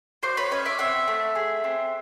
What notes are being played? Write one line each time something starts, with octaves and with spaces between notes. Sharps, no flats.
F#4 C5 D5
B4 C#5
C#4 C#5 D#5
D5 E5
C4 E5 F#5
A3
G#4
C4